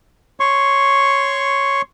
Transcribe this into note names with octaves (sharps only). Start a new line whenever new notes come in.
C#5 C6 C#6